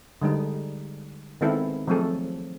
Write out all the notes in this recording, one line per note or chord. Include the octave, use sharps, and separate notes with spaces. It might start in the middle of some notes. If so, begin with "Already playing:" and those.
D3 G3 G#3 D#4
D#3 G#3 B3 C4 E4 A4
F3 F#3 A3 C4 G#4 A4